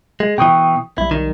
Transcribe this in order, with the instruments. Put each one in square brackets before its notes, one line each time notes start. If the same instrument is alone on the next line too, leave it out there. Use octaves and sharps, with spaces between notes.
[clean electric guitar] G#3
[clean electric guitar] B2 E3 [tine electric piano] G5 C#6 D#6
[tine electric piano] B1 G3 [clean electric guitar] E4
[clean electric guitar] D#3